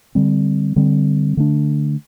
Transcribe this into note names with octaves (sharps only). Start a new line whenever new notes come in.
D3 G3 C4
D3 G3 C4
D3 A3 D4